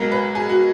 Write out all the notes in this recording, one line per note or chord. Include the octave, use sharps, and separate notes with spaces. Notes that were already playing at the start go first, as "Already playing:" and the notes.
Already playing: B1 B2 G#3 A#4
B4
G#4
F#4